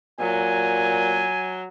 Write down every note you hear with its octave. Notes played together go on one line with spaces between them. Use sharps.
A#2 F#3 G#5